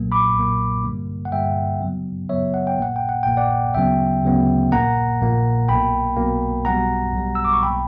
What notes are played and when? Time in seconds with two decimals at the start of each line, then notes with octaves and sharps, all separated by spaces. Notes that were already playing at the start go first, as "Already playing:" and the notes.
Already playing: B1 A#2 F#3 A#3
0.12 B5 D6
0.36 B1 A#2 F#3 A#3
0.84 G2 D3 G3 A#3
1.25 F#5
1.32 G2 D3 G3 A#3 E5 G5
1.80 F#2 C#3 F#3 B3
2.29 F#2 C#3 F#3 B3 C#5 E5
2.54 F#5
2.67 G5
2.78 A#1 A#2 A#3 F#5
2.96 G5
3.09 F#5
3.23 A#1 A#2 A#3 G5
3.37 D5 F#5
3.74 D2 C#3 F#3 B3 E5 G5
4.23 D2 C#3 F#3 B3
4.71 A#1 A#2 A#3 F#5 A#5
5.21 A#1 A#2 A#3
5.68 B1 B2 A#3 G5 B5
6.17 B1 B2 A#3
6.65 B1 B2 G3 F#5 A#5
7.13 B1 B2 G3
7.35 E6
7.45 D6
7.53 C#6
7.62 B1 B2 A#3 G5 B5